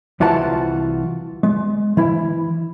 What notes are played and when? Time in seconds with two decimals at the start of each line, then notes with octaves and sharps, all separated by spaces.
0.20 C2 E3 F4 F#4 A5
1.43 G#3
1.97 E3 E4